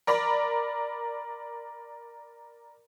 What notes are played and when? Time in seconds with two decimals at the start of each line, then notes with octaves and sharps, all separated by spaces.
0.07 A#4 D5 A#5 B5